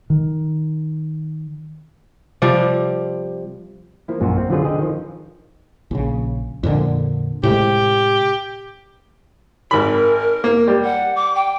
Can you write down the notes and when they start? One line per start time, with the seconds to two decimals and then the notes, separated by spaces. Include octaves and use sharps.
0.10 D#3
2.42 C3 F3 G3
4.08 F3 A#3 E4
4.20 A#1 F#2 A#2 F4 F#4
4.37 C4
4.50 D3 F3 F#3 F4 G#4 B4
4.65 D3 G#4 D#5 G5
4.79 D#3 F3
5.91 A#1 C#3
6.63 F2 A#2 D3
7.43 A2 C3 G#3 G4
9.71 G#1 A#4 B5
10.44 A#3
10.68 G3
10.84 F#5
11.16 D6
11.35 G5